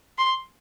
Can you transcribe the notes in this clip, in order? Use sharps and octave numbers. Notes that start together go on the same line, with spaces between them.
C6